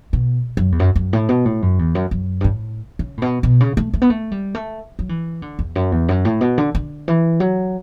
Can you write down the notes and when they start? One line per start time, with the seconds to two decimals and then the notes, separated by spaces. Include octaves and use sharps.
0.13 B2
0.57 F#2
0.72 E2
0.80 F#2
0.96 F#2
1.13 A2
1.29 B2
1.45 A2
1.62 F#2
1.79 E2
1.95 F#2
2.11 F#2
2.41 G2
2.44 A2
2.99 C#3
3.17 A2
3.22 B2
3.43 B2
3.61 C#3
3.77 A3
3.94 A3
4.02 B3
4.10 A3
4.32 G3
4.55 A3
4.99 F#3
5.09 E3
5.42 D3
5.59 E2
5.75 F#2
5.92 E2
6.09 F#2
6.25 A2
6.41 B2
6.58 D3
6.75 D3
7.08 E3
7.40 F#3